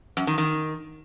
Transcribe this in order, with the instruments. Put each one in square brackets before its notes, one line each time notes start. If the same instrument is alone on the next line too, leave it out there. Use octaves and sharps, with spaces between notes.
[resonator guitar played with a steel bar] F#2
D#3
D#3